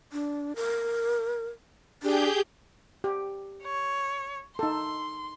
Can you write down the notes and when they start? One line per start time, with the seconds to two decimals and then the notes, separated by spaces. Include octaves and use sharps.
0.12 D4
0.56 A#4
2.02 D4 G4 G#4 G6
3.04 G4
3.64 C#5
4.59 D#4 A4 C6